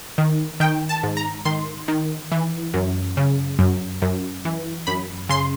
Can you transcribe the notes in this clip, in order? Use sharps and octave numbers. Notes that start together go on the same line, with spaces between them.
D#3
D#3 G5
A5
G#2
A#5
D#3 C6
D#3
E3
F#2
C#3
F#2
F#2
E3
F#2 B5
C#3 C6